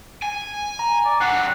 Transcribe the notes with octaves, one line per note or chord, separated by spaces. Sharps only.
G#5
A#5
D5
G2 F#3 F#5 C7